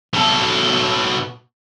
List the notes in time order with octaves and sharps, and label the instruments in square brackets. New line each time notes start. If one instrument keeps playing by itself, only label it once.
[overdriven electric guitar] B2 A4